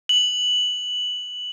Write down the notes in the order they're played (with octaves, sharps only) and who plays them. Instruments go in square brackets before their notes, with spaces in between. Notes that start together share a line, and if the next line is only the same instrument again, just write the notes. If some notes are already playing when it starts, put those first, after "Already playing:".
[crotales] F#7